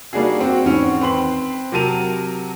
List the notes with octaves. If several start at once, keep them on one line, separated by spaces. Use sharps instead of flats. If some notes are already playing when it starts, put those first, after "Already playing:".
G3 A#3 D4 D#4 F#4 G#4
C4 F#4
E2 G#2 D#3 C4 C#4
C4 B4 C6 F#7
C3 F#3 A#4 A5 D#7 F7